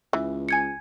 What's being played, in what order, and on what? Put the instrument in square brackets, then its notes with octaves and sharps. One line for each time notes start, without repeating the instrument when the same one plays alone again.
[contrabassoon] C#2 [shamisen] E3
[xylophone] G#5 G#6 C#7